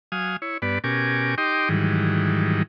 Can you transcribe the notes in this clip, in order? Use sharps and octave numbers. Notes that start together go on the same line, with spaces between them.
F#3 F5 G#5 D#6
E4 C#5
G2 B3 B4 D5
B2 C#4 G4 A#4 G#5 D6
D#4 G4 D#5 G5 C6 D6
G#2 D#3 E3 F#3 G3